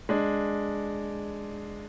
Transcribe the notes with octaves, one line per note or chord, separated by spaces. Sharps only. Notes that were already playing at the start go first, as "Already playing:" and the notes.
G#3 D4